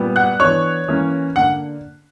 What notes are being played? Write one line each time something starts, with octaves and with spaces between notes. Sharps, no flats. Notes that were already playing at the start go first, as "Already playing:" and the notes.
Already playing: A#2 G3 B3
F#5 F#6
E3 B3 D4 C#5 C#6
E3 A#3 C#4
D3 A#3 D4 F#5